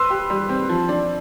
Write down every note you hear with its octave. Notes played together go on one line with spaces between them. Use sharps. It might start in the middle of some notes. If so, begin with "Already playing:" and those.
Already playing: B4 C6 E6
G4
G3
C4
F3
D4